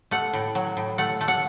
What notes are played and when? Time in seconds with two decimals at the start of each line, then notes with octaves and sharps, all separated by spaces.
0.11 A3 F#5
0.33 A2
0.55 F#3
0.77 A2
0.98 A3 F#5
1.21 A3
1.28 F#5